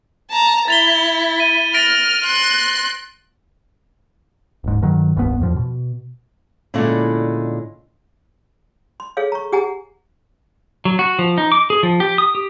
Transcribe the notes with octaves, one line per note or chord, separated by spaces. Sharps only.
A5 A#5
E4 A6 F7 G7
D#7
F6 A6 A#6 D7
C6 F#6
D1 G#2
G2 D#3 F#3
D#1 C2 G2 B3
E2 A2 F3
B2
A#2 D3 G#3 A3 C#4 E4
C6
G#4 A4 C#5 F5
A#5 C#6
G4 G#4 F#5 G#5 A#5
F#3
F#4
F3
D#4
D6
G#4
F3
G4
D#6
G4